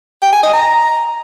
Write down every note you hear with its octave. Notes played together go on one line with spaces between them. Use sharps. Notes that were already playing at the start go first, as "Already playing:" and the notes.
G5
G#5
D#5
A#5